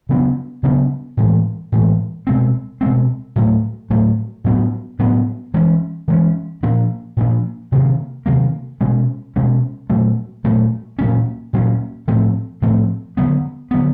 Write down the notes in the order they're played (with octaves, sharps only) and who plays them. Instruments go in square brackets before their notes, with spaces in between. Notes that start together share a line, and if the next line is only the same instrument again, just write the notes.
[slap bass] C#3 F#3 B3 D4
C#3 F#3 B3 D4
A2 E3 G#3
A2 E3 G#3
B2 G#3 C4
B2 G#3 C4
A2 F#3 A3
A2 F#3 A3
A2 F#3 B3 D4
A2 F#3 B3 D4
E3 G#3 C#4
E3 G#3 C#4
A#2 F3 A#3 D4
A#2 F3 A#3 D4
C3 D#3 F#3 A#3
C3 D#3 F#3 A#3
B2 G#3 C#4
B2 G#3 C#4
A#2 F#3 A3
A#2 F#3 A3
A#2 F#3 A#3 C#4
A#2 F#3 A#3 C#4
A2 F3 A3 C4
A2 F3 A3 C4
D3 F#3 B3
D3 F#3 B3